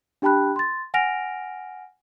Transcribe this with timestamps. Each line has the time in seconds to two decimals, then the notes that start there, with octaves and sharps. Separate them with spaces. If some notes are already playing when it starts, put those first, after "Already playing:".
0.22 D4 G4 G5 A5 B5 F#6
0.56 C6 A6
0.94 F#5 G#5 F6 A#6 D7 F7